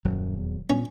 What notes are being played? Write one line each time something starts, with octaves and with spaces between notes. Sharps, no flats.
D#1 F#2 F#3
E2
A#2 B3 C#4